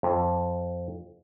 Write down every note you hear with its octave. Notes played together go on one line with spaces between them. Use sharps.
F2